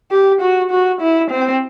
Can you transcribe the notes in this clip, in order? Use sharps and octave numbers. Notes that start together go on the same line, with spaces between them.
G4
F#4
F#4
E4
C4